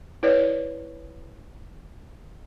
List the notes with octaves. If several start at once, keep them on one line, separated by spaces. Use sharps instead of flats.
E4 B4 C#5 D5